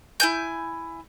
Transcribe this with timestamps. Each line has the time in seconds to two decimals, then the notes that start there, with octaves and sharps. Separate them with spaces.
0.20 E4 G#5 G6